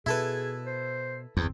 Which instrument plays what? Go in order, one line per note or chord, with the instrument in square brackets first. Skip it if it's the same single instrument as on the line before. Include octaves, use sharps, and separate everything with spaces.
[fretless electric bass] B2 [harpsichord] E4 A4 B4 [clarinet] G#4
[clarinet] C5
[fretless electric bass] G1 C4 [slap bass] E2